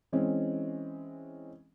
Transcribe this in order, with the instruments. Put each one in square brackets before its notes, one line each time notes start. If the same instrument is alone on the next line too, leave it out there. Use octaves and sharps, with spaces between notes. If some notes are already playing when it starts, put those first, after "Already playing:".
[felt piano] E3 G#3 C4 C#4